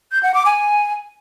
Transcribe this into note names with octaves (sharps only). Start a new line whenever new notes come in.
G6
F#5
D6
G#5